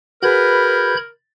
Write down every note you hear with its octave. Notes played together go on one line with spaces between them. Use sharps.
F#4 G#4 A#4 B4 B5 G6 G#6